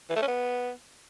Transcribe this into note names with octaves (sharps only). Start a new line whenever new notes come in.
E3
A3
C#4
B3